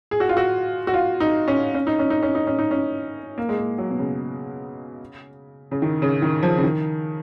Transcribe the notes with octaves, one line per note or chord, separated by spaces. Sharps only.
G#4
F#4
F4
F#4
F#4
F4
D#4
C#4
C#4
D#4
C#4
D#4
C#4
D#4
C#4
D#4
C#4
A#3
G#3
A#3
F#3
B2
C#3
C#3
D#3
C#3
D#3
F3
C#3
D#3